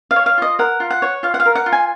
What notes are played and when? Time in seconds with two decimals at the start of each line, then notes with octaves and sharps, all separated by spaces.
0.11 F5
0.16 C#5
0.26 F5
0.38 F4 D#5
0.59 A#4 F#5
0.80 F4
0.90 F#5
1.02 C#5
1.23 F4 F5
1.34 F#5
1.40 F5
1.45 A#4
1.55 F#5
1.66 F4
1.72 G#5